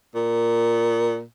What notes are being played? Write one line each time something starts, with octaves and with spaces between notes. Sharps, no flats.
A#2